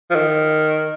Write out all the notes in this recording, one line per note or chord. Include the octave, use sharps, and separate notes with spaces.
F3
D#3